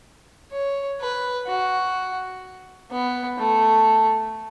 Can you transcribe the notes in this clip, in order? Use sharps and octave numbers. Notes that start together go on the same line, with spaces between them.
C#5
B4
F#4
B3
A3